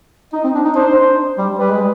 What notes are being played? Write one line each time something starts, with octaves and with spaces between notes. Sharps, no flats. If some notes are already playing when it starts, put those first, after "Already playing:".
D#4 D#5
C4
D4
D#4
D4 C5
G3
G3 B4
G#3